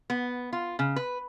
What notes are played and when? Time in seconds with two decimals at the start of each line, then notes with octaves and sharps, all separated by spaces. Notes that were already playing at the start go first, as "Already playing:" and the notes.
0.10 B3
0.53 F4
0.79 C#3
0.96 B4